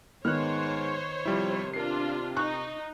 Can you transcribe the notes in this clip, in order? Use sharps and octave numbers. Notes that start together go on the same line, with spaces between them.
G#2 D#3 B3 C5 C#5 F6 F#6
C3 F3 G3 E4
D4 F4 A#4 C7
D#4 C#6 F#6